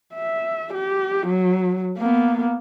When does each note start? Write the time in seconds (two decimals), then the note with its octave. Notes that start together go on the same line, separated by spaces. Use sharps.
0.15 E5
0.74 G4
1.27 F#3
1.98 A#3 B3